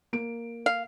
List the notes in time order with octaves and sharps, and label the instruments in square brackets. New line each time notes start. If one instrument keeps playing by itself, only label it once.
[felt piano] A#3 D7
[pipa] F5